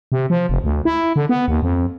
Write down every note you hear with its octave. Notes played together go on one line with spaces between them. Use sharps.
C3
F3
F1
D2
E4
D3
B3
D#2
F2